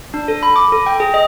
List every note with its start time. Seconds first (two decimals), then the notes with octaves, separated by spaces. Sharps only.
0.14 D4
0.28 A4
0.43 B5
0.56 D6
0.72 A4
0.86 G5
1.00 G#4
1.14 D#5